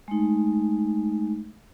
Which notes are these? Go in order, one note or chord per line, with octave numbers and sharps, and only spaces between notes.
G#3 A3 D#4